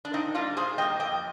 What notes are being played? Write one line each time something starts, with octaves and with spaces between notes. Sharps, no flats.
D4
A#2 C4 D#4
G3 A#3 D4 F4
A#2 G#4 C5
G3 A#3 D#5 G5
F2 D#5 G5